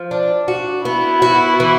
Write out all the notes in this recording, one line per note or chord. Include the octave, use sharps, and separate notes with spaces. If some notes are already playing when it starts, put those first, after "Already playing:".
Already playing: F3
D4
F#4
B3 E4
F#4
E3